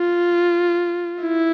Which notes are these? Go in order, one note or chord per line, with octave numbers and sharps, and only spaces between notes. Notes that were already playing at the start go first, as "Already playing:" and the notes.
Already playing: F4
E4